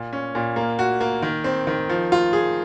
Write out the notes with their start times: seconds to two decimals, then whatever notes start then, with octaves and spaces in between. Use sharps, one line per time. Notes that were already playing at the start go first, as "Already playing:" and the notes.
Already playing: A#2
0.13 C#4
0.35 A#2
0.56 A#3
0.79 F#4
1.00 A#3
1.22 D#3
1.44 C4
1.67 D#3
1.89 F3
2.12 F4
2.33 G#4